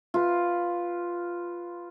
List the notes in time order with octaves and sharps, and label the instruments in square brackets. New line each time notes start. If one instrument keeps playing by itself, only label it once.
[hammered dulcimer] F4 B4